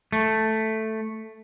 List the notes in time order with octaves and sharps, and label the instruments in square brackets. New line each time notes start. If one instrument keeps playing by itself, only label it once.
[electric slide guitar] A3